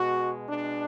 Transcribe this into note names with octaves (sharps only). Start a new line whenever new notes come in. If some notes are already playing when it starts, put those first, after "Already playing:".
Already playing: B2 G#3 F#4
B2 G#3 D4